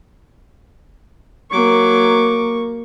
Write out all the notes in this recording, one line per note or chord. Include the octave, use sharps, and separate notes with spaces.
F#3 A#3 C#6 D6